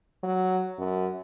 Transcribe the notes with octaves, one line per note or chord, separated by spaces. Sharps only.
F#3
F#2